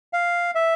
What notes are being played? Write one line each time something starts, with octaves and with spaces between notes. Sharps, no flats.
F5
E5